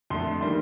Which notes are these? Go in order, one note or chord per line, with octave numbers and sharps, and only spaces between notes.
F2 D3 A3 C6
D#3 G3 A#3 C6